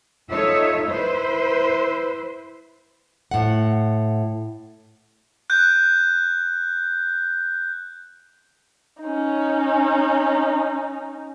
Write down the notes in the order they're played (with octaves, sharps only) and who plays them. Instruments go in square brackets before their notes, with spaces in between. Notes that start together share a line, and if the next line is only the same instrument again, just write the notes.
[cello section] D#4 F4 A4 C#5 E5
E4 B4 C5
[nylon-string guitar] A2 F#5
[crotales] F#6 G6
[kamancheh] C#4 D#4